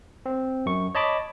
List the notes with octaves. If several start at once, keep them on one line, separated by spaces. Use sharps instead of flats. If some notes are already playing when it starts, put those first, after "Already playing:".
C4
F#2 C#6
C#5 D#5 A5 B5 D6